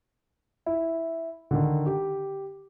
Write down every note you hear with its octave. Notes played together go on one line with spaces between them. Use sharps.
E4
D3 D#3
G4